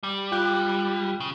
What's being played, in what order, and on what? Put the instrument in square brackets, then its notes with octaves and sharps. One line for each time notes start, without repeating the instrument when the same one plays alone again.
[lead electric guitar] G3
[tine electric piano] F4 G5 F#6
[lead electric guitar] C#3